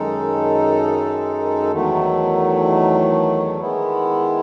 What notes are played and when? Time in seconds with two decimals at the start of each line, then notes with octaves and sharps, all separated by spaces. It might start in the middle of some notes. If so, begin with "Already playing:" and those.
Already playing: F#2 D#3 G#3 D#4 A4
1.71 E2 D#3 F#3 A3
3.60 D#3 G#3 B3 E4